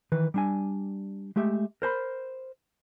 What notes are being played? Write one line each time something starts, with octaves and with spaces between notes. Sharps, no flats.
D#3 E3 B4
G3 D4 G#5
G#3 A3 G4 E5
A#4 C5 A5 B5